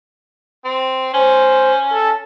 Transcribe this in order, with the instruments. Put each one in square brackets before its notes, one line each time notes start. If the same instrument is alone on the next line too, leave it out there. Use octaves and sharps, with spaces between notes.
[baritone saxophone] C4
[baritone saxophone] C#4 [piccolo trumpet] C5
[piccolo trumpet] A4